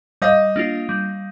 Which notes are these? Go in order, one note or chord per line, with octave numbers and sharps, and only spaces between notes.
G3 D#5 F5
A#3 D4 F4
G3